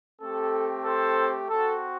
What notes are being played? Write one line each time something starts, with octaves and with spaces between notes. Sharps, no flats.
A3 C4 G4 A4
A4 C5
C4 F#4 A4